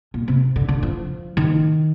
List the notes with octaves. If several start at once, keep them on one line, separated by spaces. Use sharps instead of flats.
A#2
C3
D3
D3
F3
D#3